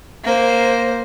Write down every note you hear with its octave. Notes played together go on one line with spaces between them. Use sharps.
A#3 C5